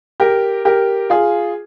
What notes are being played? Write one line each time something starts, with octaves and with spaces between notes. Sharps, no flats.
G4 A#4
G4 A#4
F4 G#4